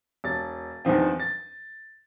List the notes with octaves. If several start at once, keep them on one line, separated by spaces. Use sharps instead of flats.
E1 A6
E2 G2 D#3 F3 C4
A6